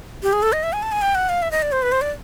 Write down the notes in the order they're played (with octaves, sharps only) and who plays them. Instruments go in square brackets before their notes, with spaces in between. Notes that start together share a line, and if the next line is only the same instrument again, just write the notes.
[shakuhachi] G4
G#4
A4
D#5
E5
G#5
A5
G#5
G5
F#5
F5
E5
D#5
D5
C5
B4
C5
D5